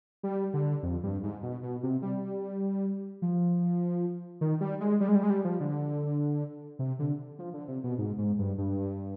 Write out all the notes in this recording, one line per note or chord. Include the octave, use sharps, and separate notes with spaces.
G3
D3
F2
G2
G#2
B2
B2
C3
G3
F3
D#3
G3
G#3
G3
G#3
G3
G#3
G3
F3
D3
C3
D3
F3
D3
C3
B2
G#2
G#2
G2
G2